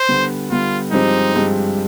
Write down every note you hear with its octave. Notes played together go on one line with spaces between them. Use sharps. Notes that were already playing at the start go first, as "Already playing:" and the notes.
Already playing: C5
D3 G3 B3
D3 G3 B3 F4
G2 F3 G#3 C4 D#4 G4
G2 F3 G#3 C4 G4